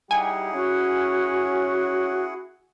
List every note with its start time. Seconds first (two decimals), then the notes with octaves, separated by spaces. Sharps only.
0.11 G3 D#4 E4 G4 G#4 F#5 G#5
0.54 C#4 F#4